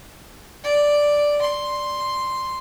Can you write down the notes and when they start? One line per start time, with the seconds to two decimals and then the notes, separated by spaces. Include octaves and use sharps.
0.64 D5
1.41 C6